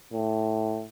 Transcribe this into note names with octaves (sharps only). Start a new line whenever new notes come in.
A2